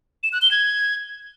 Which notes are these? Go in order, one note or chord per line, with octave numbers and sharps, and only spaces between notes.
E7
F#6
G7
G#6